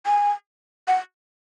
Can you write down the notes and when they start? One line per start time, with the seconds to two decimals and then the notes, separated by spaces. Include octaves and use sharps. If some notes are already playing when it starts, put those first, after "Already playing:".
0.06 G#5
0.88 F#5